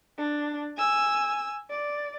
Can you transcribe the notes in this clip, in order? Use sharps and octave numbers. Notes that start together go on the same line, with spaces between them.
D4
G#5 E6
D5